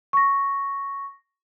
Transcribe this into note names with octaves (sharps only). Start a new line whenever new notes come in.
C#6 A#6